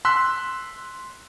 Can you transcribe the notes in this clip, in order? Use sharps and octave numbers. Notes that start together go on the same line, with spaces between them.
C6 E6 F#6 B6